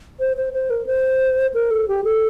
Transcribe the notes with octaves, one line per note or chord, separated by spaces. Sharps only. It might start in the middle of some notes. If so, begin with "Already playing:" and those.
C5
C5
C5
A#4
C5
A#4
A4
G4
A4